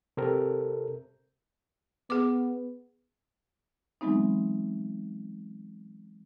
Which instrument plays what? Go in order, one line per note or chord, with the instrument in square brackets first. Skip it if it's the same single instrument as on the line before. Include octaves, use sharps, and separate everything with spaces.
[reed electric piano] C3 C4 A4 A#4
[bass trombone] B3 [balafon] G#4 D6
[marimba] E3 F#3 G#3 B3 C4 D#4